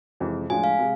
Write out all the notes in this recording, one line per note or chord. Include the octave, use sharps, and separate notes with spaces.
F2 C3 E3 G#3
A2 F3 G#3 D4 F4 G#5
F5
C3 G#3